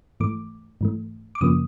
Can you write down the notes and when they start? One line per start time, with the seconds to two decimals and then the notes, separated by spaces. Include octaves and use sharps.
0.20 G#2 E3 A3 D6
0.81 G#2 E3 A3
1.35 D6
1.41 F#2 C#3 F3 A#3 D#6